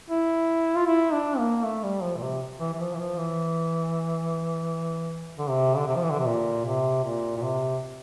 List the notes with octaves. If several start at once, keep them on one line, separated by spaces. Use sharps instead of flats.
E4
F4
E4
D4
A#3
A3
G3
F3
A#2
C3
E3
E3
F3
E3
F3
E3
D3
C3
D3
C3
F3
E3
D3
C3
A#2
C3
A#2
A#2
C3